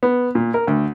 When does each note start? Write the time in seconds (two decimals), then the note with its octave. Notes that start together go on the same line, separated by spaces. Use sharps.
0.03 B3
0.35 A#2
0.54 A#4
0.67 D2